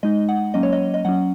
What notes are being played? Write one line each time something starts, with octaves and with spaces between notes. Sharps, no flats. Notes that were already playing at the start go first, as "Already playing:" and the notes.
G#3 D#4 D#5
F#5
F#3 A#3 C#4 D#5
C#5
D#5
D#5
F#3 C#4 F#5